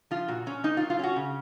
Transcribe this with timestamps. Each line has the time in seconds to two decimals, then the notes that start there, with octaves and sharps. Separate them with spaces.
0.11 F3 F4
0.28 A#2 F#4
0.46 A#2 C#4
0.64 A#3 D#4
0.77 F4
0.81 F#3
0.90 F4
0.99 C#4 F#4
1.16 C#3